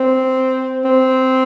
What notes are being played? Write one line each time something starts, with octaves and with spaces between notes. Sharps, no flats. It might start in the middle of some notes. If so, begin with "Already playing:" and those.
Already playing: C4
C4